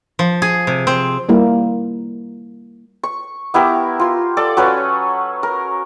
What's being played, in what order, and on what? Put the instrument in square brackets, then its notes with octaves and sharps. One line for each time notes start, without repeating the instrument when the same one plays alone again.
[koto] F3
G#4
C3
C4
[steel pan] G3 A#3 E4
[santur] C#6
B3 E4 G4 A#4
F4 C6
A4 D5
F#3 C#4 B4 C#5
A#4